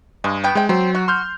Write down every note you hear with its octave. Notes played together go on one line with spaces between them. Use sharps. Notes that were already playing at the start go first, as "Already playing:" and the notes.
G2 G#3
B3 G5
C3 G#3 G5
F#3 C4
F#4
C6 F6 G6